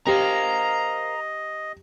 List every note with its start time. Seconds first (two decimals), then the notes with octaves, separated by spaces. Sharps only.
0.07 G4 A#4 C5 D#5 F5 A#5